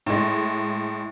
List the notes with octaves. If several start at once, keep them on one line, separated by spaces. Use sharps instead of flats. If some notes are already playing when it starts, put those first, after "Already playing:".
A2 G#3